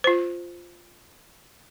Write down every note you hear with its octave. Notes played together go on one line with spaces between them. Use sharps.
F4 C5